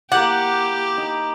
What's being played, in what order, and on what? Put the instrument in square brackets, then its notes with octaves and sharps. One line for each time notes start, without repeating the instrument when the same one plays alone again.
[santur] A#3 E4 [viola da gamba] G4 [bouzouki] F#5 [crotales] D6 G6 F#7
[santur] D#4 A#5